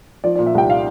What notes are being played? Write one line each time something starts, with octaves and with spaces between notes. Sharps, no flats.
F3 D5
A#2 D5
E5
C2 G5
F5